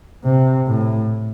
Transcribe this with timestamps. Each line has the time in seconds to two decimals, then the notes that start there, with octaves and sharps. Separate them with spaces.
0.24 C3
0.67 A2